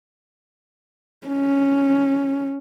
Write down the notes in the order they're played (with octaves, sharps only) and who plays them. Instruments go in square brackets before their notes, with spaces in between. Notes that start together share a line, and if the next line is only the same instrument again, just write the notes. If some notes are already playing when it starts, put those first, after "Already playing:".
[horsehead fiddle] C#4